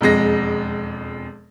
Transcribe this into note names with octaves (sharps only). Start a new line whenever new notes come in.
E1 F2 G#3 A#6